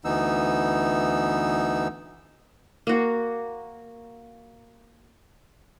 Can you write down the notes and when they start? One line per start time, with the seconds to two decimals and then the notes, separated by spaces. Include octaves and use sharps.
0.05 D2 E3 B3 D#4 E6
2.87 A#3 F#4